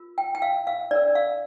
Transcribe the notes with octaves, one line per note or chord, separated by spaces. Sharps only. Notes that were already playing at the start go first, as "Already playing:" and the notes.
Already playing: F4 A#4
G5
G5
F5
F5
D4 A#4 D5
F5